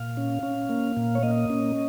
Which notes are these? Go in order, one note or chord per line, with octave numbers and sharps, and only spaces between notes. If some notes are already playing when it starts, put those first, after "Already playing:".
Already playing: A#2 F5
C#4
C#4
A#3
A#2
C#5
A#3 D#5
C#4